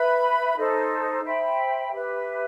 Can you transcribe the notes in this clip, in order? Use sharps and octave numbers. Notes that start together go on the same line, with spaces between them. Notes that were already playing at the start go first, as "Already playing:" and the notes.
Already playing: B4 E5 B5
D#4 A4 C5
C5 E5 G5 B5
G4 B4 E5